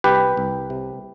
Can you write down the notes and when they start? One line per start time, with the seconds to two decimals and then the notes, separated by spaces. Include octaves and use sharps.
0.04 C2 G4 B4
0.37 C2
0.70 C3